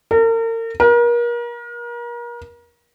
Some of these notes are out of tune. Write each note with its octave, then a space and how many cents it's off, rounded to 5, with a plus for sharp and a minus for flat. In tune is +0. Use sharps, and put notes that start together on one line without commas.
A#4 -40
A#4 +35